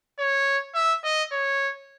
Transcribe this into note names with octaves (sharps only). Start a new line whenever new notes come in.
C#5
E5
D#5
C#5